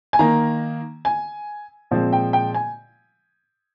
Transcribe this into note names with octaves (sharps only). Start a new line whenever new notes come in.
G#5
D#3 A#3 A#5
G#5
A#2 F3 G#3 C4
G5
G5
G#5